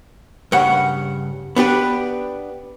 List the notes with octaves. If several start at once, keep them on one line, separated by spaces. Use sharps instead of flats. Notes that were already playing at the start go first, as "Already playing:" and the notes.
G2 C#3 F#5
B3 D4 G4 B4